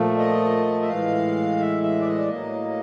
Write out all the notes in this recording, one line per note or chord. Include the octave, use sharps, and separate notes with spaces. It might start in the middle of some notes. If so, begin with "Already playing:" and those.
Already playing: A#2 F3 A3
D#5
E5
A2 E3 G#3 F5
E5
E5
D5
D#5
D5
A2 F#3 A#3 D#5